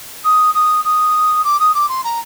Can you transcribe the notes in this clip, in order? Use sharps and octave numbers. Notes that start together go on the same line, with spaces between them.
D#6
D#6
D#6
D6
D#6
D6
C6
A#5